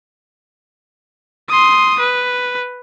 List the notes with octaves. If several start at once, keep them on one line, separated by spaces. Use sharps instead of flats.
C6 D#6
B4